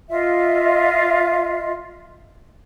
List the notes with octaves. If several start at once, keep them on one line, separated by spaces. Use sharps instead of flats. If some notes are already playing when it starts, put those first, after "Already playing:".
F4 D#5 E5